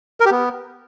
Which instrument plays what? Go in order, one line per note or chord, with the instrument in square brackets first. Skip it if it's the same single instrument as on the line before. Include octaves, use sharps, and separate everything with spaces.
[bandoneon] A#4
G4
B3